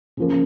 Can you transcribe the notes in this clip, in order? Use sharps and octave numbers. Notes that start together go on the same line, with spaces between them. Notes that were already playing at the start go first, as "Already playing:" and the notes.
C#3 F3 A#3